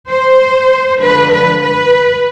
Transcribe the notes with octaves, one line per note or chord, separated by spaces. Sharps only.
C5
D3 F3 G#3 B4
B4
B4